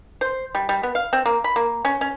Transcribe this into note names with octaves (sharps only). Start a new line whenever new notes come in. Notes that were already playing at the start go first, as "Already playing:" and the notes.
C5
G3
G3
B3
F5
C4
A#3
B5
A#3
C#4
C#4